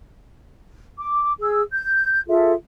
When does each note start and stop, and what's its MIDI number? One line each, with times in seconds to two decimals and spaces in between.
0.98 1.32 86
1.40 1.63 68
1.40 1.63 88
1.71 2.21 91
2.28 2.53 65
2.28 2.53 68
2.28 2.53 69
2.28 2.53 76